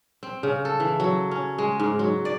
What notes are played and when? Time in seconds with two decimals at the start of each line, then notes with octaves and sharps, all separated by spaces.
0.23 C4
0.43 C#3
0.65 A4
0.80 E3
1.00 F#3
1.31 C#4
1.58 G#3
1.80 G#2
1.99 F#3
2.25 D5